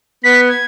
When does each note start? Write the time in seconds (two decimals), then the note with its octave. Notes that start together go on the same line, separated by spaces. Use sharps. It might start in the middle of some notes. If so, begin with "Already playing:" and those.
0.24 B3 B6
0.49 G#6